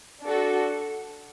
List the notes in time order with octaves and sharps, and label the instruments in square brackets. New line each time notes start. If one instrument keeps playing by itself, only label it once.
[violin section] D4 F#4 A4